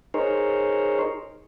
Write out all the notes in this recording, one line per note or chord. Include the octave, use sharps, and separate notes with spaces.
D#4 G#4 A#4 C5 C#5